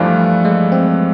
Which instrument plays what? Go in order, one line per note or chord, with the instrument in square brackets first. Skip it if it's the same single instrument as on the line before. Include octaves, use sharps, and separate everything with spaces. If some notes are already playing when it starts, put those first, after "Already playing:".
Already playing: [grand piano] G2 E3 A3 D4 F4 [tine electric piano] F3
[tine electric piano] G#3
C4